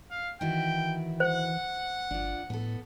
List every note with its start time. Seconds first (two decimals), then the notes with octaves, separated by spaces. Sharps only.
0.10 F5
0.41 D#3 E3 E4 F#4 G5
1.20 C5 F#5
2.11 G1 D4 F4
2.50 A2 B3 A4